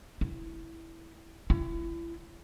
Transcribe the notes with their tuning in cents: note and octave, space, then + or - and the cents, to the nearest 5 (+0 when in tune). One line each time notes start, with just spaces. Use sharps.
E4 +0
E4 +30